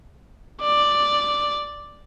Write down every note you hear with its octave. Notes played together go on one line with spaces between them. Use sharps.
D5